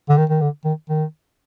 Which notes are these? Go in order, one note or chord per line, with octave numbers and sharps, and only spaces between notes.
D3
D#3
D#3
D3
D#3
D#3